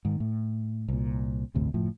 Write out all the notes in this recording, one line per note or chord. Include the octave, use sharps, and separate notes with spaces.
G#2 D#3
A2
C2 A#2
G1 D2 A2 C3
F#1 A2 F3